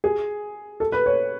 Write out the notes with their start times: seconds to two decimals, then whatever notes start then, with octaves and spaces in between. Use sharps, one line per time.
0.04 G#4
0.80 A4
0.92 B4
1.06 C#5